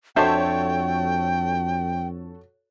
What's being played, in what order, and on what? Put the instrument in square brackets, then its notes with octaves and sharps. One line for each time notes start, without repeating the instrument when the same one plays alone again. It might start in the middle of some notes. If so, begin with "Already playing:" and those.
[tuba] F2 [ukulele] D4 C5 E5 [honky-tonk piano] F#4 A4 C#5 [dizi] G5